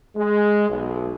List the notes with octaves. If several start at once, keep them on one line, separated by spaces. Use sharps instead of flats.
G#3
B1